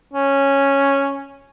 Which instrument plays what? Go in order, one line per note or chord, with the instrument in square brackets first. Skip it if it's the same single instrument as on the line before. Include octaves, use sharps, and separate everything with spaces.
[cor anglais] C#4